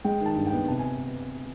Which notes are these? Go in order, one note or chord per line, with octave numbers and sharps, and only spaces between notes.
G#3 G5
D#3
A5
G2
G5
B3
C3 A5
G#5